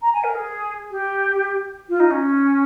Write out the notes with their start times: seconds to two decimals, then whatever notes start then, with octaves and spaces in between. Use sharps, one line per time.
0.01 A#5
0.13 G#5
0.23 A#4
0.34 G#4
0.90 G4
1.88 F4
1.99 D#4
2.10 C#4